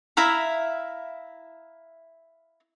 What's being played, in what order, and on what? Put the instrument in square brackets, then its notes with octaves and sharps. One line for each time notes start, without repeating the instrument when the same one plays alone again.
[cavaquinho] E4 E5 F5 A#5